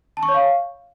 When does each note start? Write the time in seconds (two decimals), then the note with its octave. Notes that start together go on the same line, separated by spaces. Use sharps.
0.17 A5
0.23 C#6
0.28 C#5
0.34 F5